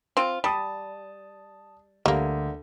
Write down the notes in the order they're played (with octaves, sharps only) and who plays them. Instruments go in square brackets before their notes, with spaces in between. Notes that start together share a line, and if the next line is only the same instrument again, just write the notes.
[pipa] C4 F4
[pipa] G3 [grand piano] A5 D#6
[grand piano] D2 [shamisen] G3 A#3